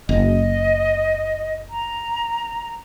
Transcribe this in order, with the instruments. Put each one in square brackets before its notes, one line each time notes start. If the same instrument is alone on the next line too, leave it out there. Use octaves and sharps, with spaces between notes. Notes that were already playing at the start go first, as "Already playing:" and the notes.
[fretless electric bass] F#1 [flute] D#5
[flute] A#5